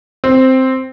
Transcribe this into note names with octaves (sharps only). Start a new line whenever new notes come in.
C4